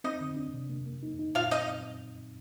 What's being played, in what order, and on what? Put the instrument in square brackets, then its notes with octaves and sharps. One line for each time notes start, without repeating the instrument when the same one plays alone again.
[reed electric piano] C4 [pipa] D#4 D#5
[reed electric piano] D3
D4
C3
A#3
A#3
D#4
D#4
[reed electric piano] A#2 [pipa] F4 F5
[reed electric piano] C4 [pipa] D#4 D#5